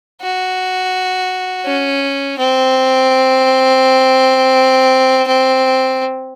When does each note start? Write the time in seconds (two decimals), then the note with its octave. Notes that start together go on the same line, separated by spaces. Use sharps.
0.22 F#4
1.66 C#4
2.38 C4
5.27 C4